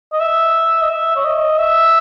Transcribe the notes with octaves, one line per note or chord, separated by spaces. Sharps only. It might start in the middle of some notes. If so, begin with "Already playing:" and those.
D#5
E5
D#5
E5
C#5
D#5
E5